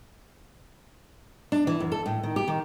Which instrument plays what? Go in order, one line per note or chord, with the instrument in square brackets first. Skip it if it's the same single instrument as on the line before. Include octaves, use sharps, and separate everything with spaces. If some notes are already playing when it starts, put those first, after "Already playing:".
[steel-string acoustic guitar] D4
E3
F#2
A4
A2
D#3
G4
D#3